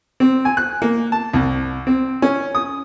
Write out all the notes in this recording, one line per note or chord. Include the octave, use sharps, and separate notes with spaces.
C4
G#5
F#6
A#3
A5
C2
C4
C#4
D#6